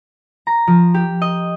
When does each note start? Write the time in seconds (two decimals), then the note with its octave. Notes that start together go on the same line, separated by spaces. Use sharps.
0.47 A#5
0.67 F3
0.94 G4
1.22 D#5